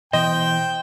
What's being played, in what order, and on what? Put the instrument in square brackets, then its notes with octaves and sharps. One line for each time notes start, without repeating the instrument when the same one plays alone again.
[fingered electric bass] B2 E3 [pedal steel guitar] C5 [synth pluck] D#5 [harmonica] G5